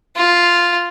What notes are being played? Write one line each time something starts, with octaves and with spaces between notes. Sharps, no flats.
F4